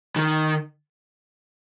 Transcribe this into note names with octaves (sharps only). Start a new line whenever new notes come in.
D#3